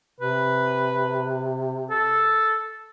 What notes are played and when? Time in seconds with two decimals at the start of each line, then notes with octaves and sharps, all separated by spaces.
0.20 C3 B4
1.91 A4